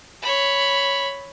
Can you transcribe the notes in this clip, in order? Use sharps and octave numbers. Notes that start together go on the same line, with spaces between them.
C#5 B5